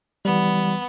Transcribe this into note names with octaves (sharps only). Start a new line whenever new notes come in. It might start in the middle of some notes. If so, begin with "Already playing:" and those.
E3 G3 B3